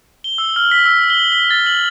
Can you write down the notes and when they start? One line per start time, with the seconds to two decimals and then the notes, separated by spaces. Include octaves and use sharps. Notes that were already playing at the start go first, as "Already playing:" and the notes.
0.24 G7
0.38 E6
0.56 F6
0.71 B6
0.86 E6
1.10 G7
1.32 B6
1.51 A6
1.66 F#7